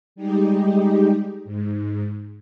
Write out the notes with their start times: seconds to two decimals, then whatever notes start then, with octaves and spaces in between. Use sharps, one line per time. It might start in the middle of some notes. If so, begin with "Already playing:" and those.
0.16 G3 G#3 D#4 G4
1.45 G#2